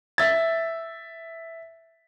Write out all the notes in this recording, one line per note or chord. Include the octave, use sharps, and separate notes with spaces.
E5 A6